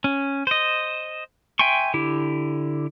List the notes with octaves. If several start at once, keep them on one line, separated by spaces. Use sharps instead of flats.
C#4
C5 D#5
E5 G5 G#5 C6 C#6
D3 E4 G4